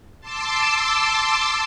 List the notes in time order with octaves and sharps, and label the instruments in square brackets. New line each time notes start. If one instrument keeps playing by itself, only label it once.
[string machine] A5 C6 D6 E6